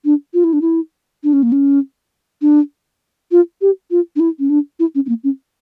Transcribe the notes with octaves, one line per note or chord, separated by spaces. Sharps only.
D4
F4
E4
D4
E4
D4
C#4
A#3
C#4
D4
F4
G4
F4
D4
E4
C#4
D4
E4
C#4
C#4
A#3
C#4